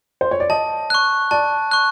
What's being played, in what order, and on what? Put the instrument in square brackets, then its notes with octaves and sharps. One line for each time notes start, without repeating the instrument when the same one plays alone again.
[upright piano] C5
C#5
D5
[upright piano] D#5 [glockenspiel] A5
[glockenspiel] C#6 F#6
[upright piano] D5 [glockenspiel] A5
[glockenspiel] C#6 F#6